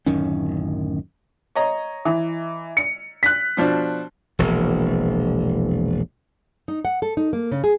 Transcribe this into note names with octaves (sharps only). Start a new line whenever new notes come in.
D1 F#2 D#3 C#4
C#5 D#5 A#5
E3
C#7
F#6 B6
B2 F3 D4
E1 A#1 E2
D#4
F#5
A4
D#4
A#3
C#3
G#4